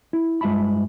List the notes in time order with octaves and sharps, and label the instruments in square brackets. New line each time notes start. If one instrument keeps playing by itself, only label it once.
[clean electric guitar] E4
G2 G#3 F4 E5 A5 B5